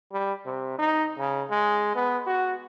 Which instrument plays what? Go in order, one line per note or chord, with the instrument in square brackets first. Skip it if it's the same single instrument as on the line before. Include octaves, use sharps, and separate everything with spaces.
[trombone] G3
C3
D#4
C#3
G#3
B3
F#4